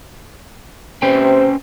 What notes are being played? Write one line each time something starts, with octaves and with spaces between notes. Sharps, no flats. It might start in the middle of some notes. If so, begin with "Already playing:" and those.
C3 C#4 B4 C5 G5